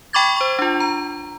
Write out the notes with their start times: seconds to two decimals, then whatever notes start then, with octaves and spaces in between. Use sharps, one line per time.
0.13 G5 B5 C#6 D6 G#6 A6
0.36 C5 C#6
0.59 D4 F4
0.80 A#5